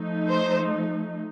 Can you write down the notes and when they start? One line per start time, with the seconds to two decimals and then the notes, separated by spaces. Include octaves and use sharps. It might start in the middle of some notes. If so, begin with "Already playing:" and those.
Already playing: F3 A3 D#4
0.30 C5